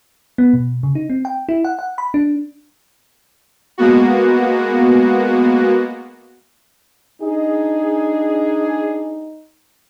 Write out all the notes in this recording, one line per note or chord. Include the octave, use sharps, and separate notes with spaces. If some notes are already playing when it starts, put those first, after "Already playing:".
B3
B2
C#3
D#4
C4
G5
E4
F#5
F#5
B5
D4
G#3 A#3 B3 F#4
D4 D#4 G#4